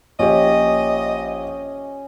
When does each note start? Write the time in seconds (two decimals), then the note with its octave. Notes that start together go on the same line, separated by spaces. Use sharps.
0.19 A#1 C#4 G4 D#5